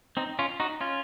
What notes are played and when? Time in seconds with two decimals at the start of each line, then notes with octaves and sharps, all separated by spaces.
0.17 C4 D#4
0.39 C#4 F4
0.60 D#4 F#4
0.81 C#4 F4